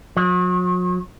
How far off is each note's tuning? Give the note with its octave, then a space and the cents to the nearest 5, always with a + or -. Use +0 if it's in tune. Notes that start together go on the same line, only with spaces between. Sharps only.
F#3 -45